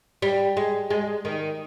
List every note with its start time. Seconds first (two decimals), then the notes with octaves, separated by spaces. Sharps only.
0.22 G3
0.57 G#3
0.91 G#3
1.25 D#3